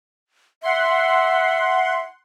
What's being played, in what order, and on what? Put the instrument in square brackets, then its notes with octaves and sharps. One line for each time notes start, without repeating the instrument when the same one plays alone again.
[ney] E5 [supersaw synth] F#5 C6